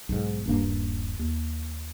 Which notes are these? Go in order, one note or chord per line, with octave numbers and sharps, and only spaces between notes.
B1 G#2
D#1 G2 A#3
D#2